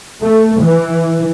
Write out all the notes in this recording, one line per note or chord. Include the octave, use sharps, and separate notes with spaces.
A3
E3